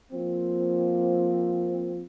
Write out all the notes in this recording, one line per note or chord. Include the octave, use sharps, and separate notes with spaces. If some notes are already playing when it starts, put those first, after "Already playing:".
F3 A#3 C4